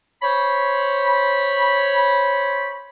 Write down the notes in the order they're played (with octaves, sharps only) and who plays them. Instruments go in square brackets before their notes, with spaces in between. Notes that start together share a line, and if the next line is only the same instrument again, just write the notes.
[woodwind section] C5 C#5 B5